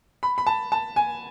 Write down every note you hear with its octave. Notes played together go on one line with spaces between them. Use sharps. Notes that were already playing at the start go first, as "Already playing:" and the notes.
B5
B5
A5
A5
G#5